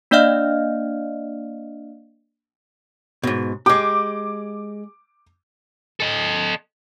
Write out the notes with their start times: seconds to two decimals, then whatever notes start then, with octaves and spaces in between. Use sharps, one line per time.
0.11 A#3 D4 D5 D#5 F5 F6
3.23 G#2 B2
3.66 G#3 G4 D6
6.00 A4 D#5